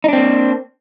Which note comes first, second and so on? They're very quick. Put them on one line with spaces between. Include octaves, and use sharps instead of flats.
D#4 D4 C4 A#3